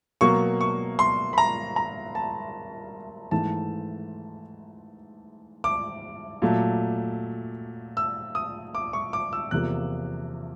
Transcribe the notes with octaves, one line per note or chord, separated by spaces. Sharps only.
B2 F#3 A#3 C#6
C#6
C6
B5
A#5
A#5
A5
G#2 E3 A3 A5
D6
A#2 F#3 A3
E6
D#6
D6
C#6
D6
E6
E2 C3 F3 A#3 F#6